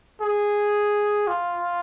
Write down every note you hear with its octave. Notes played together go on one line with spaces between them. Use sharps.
G#4
F4